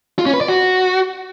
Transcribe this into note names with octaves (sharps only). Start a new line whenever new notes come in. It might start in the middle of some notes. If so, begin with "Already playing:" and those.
F4
C#4
B4
D5
F#4